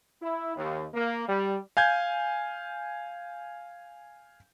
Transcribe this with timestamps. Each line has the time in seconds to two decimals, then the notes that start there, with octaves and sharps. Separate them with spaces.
0.22 E4
0.57 D#2
0.94 A#3
1.28 G3
1.77 F5 G#5 G6 G#6